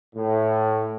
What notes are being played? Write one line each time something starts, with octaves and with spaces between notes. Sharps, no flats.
A2